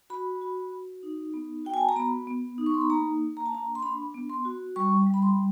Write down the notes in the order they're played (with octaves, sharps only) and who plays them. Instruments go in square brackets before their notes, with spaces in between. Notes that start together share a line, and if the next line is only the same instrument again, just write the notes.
[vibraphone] F#4 B5
F#4
F#4
D#4
B3
F#4 G5
G#5
A5
A#5
B3 B5
B3
D#4
C#6
C6
B5
A#3 A#5
A#3
A#5
A5
D4 A#5
C6
D4 B5
B3
C6
F#4
G3 C#6
G3
B5
C6